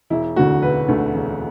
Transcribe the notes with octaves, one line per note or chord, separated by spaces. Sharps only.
E1 E4
D2 D3 A3 F#4
E1 B4
D2 D3 A3
E1